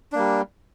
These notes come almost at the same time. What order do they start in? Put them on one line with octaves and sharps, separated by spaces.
D4 A#3 G3